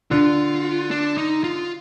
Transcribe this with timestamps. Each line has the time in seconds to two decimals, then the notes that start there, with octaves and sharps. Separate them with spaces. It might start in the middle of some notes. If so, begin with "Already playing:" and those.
0.11 D3 F4
0.91 D4
1.17 D#4
1.44 F4